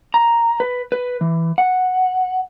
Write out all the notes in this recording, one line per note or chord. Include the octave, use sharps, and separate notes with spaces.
A#5
B4
B4
E3
F#5